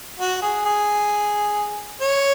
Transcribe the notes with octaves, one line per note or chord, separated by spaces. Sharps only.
F#4
G#4
G#4
C#5